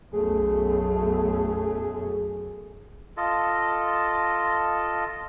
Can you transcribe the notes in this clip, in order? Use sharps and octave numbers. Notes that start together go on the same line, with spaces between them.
B1 F#2 A3 G#4
F4 A4 D#5 A5